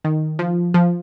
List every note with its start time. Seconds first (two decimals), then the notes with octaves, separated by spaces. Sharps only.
0.05 D#3
0.39 F3
0.74 F3